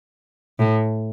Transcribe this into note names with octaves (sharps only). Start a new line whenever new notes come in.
A2